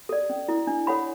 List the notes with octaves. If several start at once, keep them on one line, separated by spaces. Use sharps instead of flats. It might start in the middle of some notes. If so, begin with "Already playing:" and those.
A4 D5
C#4
E4 A4
D4
A4 C#5 F#5 B5